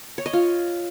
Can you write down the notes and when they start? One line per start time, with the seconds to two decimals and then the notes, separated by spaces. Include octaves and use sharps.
0.18 C#5
0.26 D#5
0.33 F4